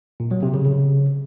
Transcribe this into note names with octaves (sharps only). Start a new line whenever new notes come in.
A#2
F#3
C3
C#3
C#3